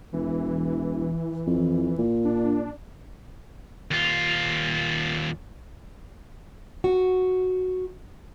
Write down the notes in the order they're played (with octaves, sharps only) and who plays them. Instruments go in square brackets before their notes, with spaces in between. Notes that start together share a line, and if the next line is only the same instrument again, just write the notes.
[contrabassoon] E1 [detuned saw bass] E3
[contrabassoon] F2
A#2
[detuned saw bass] D4
[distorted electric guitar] D#2 F4
[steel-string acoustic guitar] F#4